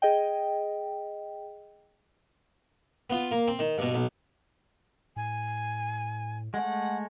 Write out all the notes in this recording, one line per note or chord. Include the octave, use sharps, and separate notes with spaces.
G#4 D#5 G5
B3 F4
A#3
C4
D#3
G2 B2
B1
A2 G#5
G#3 A3 F#5